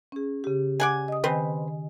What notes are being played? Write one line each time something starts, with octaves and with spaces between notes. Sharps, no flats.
C#4 G#4
C#3 G4
D5 F#5 G#5
D#5 D#6
D#3 C4 B4 C5 G#5